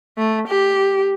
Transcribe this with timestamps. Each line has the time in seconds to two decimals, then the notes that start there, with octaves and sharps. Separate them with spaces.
0.18 A3
0.48 G4